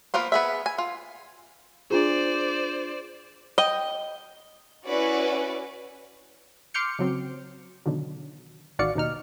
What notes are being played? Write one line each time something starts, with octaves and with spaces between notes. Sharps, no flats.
F3 A#3 B3 F4 C5
B3 G#4 E5
G#5
F4
D4 F4 G#4 C5 D5
D#5 G5
C#4 E4 F#4 B4 D5
C6 D6 F6 G6 C#7
C#3 F#3 C4
B2 D3 D#3 F#3
A1 D#3 F#4 D5 F5 C#7
D#2 B2 D#4 F6